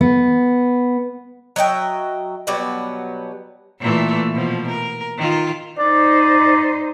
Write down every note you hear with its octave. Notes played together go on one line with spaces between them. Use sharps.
B3
F#3 D#5 E5 G5
B2 F#3 G3 B3
A#2 E3 A3
B2 F3
A#4
D#3 F4
D#4 C5 D5